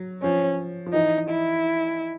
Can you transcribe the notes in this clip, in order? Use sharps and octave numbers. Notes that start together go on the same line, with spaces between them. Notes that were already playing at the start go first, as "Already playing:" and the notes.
Already playing: F#3
F3 C#4
F3
E3 D#4
E4